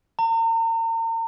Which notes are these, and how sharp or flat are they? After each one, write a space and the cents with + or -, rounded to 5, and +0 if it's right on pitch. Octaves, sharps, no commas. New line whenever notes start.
A#5 -40